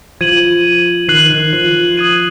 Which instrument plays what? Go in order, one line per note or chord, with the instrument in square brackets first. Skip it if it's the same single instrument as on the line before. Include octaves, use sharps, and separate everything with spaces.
[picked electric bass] F3 [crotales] G#6 D#7 F#7
[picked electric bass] D#3 [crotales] F#6 C7 F#7
[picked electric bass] D#3
F3
[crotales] D#6 G#6 D#7 F#7